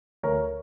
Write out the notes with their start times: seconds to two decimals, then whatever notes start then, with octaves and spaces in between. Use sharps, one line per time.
0.23 D2 A#4 C#5